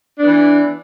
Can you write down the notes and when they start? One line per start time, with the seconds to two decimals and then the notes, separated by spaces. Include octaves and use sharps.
0.18 D4
0.22 B3
0.27 E3